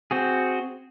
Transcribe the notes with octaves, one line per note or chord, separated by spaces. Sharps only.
C4 F#4 G#4